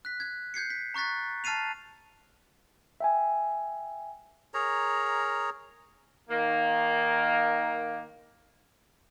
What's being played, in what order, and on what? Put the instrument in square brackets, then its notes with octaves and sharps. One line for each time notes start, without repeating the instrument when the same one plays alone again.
[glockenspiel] F#6 B6
F#6 G#6
G6 G#6 C7 C#7
B6
A#5 C#6 F#6 A6 B6
A5 F6 A6 C7 D#7 F7
[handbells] E5 G5 G#5
[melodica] G#4 A#4 C#5 A#5
[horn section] D#3 A#3